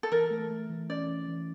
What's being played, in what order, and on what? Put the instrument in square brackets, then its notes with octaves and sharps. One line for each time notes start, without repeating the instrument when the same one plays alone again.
[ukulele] A4
[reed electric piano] E3 [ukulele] A#4
[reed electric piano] A3
A3
E3
[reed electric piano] C#4 [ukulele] D5
[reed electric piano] E3
E3